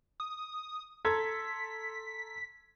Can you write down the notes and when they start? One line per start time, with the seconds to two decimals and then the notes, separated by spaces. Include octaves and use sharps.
0.20 D#6
1.05 A4 A#5 C6 G#6 B6